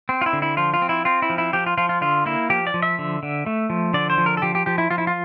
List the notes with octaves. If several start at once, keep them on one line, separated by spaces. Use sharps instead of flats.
C4
F4
E4
D3
E4
F3 F4
F4
C4
E4
C4 F4
E4
F3
E4
F3 G4
F4
F3 F4
F4
D3 F4
A#3 E4
F3 G4
D5
F3
E5
D3
D3
A3
F3
D3 D5
C5
F3
A#4
A4
F3 G4
G4
F3 G4
E4
F3 F4
E4
F4